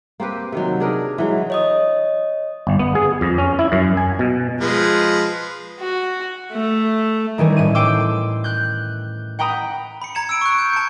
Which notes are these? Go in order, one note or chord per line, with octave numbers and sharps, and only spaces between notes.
A#3 C4 G4 B4
C3 D#3 F#3
D4 G#4 A#4 B4
E3 F#3 G#3
C#5 D#5 D#6
G1
B3
G#4
F2
C#4
E4
F#2
G#5
B2
F3 G#3 B4
F#4
A3
D#3 E3 G3 C#4
A2 E4 D#7
G5 C6 D6 E6
F#6 G6
F#5 G5 A#5 B5 D#6
B5 C#7
A#5 G#6 C#7 E7
E6 D7
C#6 F#6
G6
A5 C#7